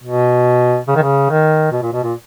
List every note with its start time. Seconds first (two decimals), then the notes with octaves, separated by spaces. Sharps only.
0.03 B2
0.88 C#3
0.96 D#3
1.03 C#3
1.30 D#3
1.72 B2
1.82 A#2
1.93 B2
2.03 A#2